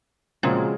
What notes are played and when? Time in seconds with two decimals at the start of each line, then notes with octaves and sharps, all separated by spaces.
0.43 A#2 C#3 F3 G#3 C4 F#4